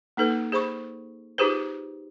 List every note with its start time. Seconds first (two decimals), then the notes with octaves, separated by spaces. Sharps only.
0.17 A#3 D#4 A4 B4
0.52 G#4 C5 B5 C#6
1.38 D#4 F4 G4 G#4 B4 C5